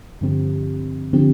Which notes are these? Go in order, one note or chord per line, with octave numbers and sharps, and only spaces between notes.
G2 D3 F3 C4 G4
D3 F3 C4 G4